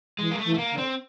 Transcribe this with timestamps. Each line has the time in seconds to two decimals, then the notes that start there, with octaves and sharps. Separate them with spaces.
0.19 E3 G#3
0.31 A#3
0.39 A3
0.44 E3
0.54 A3
0.58 A#3
0.72 D3
0.78 C4